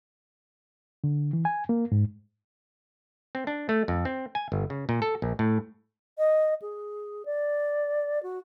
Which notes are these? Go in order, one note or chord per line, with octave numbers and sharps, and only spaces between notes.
D3
E3
G#5
A#3
G#2
C4
D4
A3
F2
C4
G#5
G1
C#3
A#2
A4
A#1
A2
D#5
G#4
D5
F#4